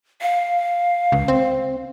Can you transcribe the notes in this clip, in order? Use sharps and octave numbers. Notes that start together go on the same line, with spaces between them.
F5
C#2
C4